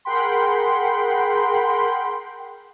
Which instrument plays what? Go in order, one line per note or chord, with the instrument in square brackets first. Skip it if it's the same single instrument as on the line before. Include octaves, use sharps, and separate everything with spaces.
[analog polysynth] G#4 A#4 F#5 G5 B5 C6